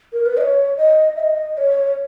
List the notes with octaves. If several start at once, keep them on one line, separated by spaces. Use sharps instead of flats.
A#4
B4
D#5
C#5
D#5
E5
D#5
D#5
C#5